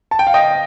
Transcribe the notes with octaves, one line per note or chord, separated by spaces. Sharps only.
A5
G5
F5
D#5 G5